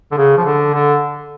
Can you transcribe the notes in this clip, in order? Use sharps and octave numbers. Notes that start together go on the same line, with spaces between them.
D3
C#3
F3
D3
D3